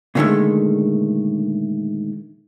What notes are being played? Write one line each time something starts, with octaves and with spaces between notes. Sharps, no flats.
A#2 D3 D#3 F#3 G#3 A3